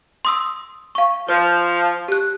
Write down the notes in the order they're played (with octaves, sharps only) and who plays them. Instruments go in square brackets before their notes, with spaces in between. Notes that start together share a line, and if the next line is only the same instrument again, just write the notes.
[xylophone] C6 D#6 E6
F5 C#6
[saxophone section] F3 [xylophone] C5
[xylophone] G4 F#6